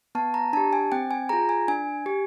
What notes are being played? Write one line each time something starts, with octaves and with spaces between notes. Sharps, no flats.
B3 A5
A#5
D4 G4 A5
G#5
C4 G5
G#5
F4 G#4 A#5
G#5
D4 G#5
G4